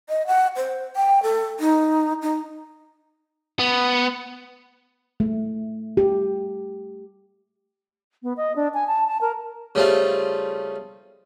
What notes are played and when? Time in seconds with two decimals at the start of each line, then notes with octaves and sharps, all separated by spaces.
0.09 D#5
0.27 F#5
0.56 C5
0.96 G5
1.23 A4
1.60 D#4
2.22 D#4
3.59 B3
5.20 A3
5.97 G4
8.23 B3
8.37 D#5
8.56 D4
8.74 G#5
8.87 A5
9.07 A5
9.21 A#4
9.75 C#3 G3 A3 C4 F4